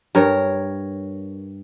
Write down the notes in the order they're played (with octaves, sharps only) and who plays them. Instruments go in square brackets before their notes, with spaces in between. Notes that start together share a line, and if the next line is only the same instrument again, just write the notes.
[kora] G2 A#4 C#5